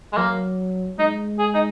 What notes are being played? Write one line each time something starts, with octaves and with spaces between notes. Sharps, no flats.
G#3
F#3 A#3
G#3 D#4
G#4
D#4